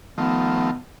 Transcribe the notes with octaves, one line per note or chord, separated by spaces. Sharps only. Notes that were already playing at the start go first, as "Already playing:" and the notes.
D#3 F3 A3 B3